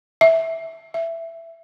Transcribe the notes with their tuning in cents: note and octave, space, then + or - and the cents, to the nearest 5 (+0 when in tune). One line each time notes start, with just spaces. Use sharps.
E5 -10
E5 +10